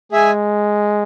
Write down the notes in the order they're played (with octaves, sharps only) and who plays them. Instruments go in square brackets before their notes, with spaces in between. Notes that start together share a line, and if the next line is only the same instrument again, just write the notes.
[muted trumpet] G#3 [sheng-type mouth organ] G#4 E5 G#5